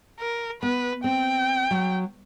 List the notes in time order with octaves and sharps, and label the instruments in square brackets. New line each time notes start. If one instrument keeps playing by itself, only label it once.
[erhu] A#4
[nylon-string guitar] B3 [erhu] B4
[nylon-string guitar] C4 [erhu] G5
[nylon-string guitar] F#3